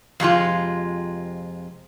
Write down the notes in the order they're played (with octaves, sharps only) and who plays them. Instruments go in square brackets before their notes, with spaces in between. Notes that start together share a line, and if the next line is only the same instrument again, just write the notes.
[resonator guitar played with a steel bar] F2 C3 G#3 F4